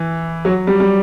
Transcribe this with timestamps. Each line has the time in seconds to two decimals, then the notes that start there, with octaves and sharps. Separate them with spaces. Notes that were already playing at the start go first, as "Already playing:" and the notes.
Already playing: E3
0.45 F#3
0.67 G3
0.80 G3